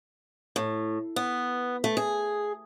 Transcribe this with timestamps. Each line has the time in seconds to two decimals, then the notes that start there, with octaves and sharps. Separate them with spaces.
0.56 A2
1.16 B3
1.84 A3
1.97 G#4